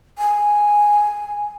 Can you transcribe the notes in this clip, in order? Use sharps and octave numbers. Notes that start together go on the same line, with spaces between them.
G#5